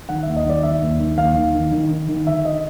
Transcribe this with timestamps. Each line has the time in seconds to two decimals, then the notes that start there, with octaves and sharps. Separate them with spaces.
0.09 D#3 F#5
0.23 D#2 E5
0.37 D#5
0.45 D#3 D5
0.63 D#3 E5
0.82 D#2
1.00 D#3
1.18 D#2 F5
1.36 D#3
1.55 D#3
1.72 D#3
1.91 D#3
2.09 D#3
2.27 D3 E5
2.45 D#5